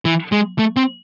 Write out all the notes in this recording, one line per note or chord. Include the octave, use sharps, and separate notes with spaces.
E3
G#3
A3
C4